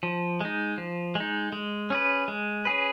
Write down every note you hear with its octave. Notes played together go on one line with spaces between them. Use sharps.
F3
G#3 D#4
F3
G#3 D#4
G#3
C#4 G#4 B4
G#3
C#4 G#4 B4